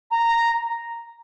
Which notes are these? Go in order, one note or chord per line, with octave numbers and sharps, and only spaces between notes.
A#5